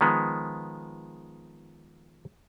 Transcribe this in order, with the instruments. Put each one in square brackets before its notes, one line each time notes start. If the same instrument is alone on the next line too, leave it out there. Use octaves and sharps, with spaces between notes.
[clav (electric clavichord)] D#3 F3 G#3 B3